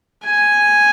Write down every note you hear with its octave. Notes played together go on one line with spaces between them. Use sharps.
G#5